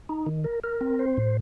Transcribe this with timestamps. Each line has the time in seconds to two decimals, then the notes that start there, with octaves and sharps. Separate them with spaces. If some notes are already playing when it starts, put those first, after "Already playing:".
0.09 D#4
0.26 D#3
0.44 A#4
0.64 A#4
0.81 C4
0.99 C5
1.17 A2